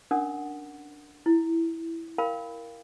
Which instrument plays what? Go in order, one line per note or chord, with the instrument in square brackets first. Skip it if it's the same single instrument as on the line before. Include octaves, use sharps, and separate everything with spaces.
[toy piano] C#4 D4 A#4 F#5 D#6
E4
A#4 F5 G5 B5